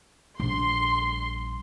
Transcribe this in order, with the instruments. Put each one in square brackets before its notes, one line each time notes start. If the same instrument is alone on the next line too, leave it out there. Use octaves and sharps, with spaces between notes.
[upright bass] A#1 G3 [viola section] C6